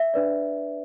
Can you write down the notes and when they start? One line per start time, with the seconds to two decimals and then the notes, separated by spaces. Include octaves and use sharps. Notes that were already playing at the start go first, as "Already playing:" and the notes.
Already playing: E5
0.14 D4 B4 D5